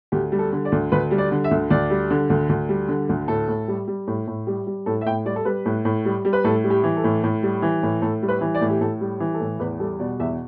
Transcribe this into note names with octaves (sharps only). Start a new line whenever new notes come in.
D2 G4
G3
A4
D3
D5
D2
D2 B4
G3
D5
D3
E5
D2
D2 D5
G3
D3
D2
D2
G3
D3
D2
A2 A4
A2
G3
G3
A2
A2
G3
G3
A2 A4
E5
A2 G5
G3 D5
A4
G3 B4
A2
A2
G3
G3
B4
A2 A4
G3
G4
E3
A4
A2
A2
G3
E3
A2
A2 A4
G3
B4
E3
D5
A2
G4
A2 A4
G3
E3
A4
A2
E2 B4
G3 A4
B2 D5
E2 E5